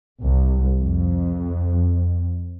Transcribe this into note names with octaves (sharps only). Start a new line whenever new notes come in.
C2
F2